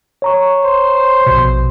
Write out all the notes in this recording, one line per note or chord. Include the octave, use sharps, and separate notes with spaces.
C#5 A#5 C#6
C5
A#1 B2